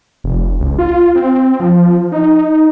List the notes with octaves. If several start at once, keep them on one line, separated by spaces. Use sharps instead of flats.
F1
C#2
F4
C4
F3
D#4